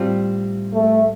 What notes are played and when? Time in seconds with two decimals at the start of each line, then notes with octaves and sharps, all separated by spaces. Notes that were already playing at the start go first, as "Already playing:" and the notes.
Already playing: A2 G3 C4 F4
0.73 A3